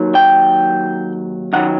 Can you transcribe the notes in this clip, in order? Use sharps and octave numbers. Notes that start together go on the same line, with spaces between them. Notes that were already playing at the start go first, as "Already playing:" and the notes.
Already playing: D#2 D#3 F#3
G5
F#2 D#3 F#3 F#5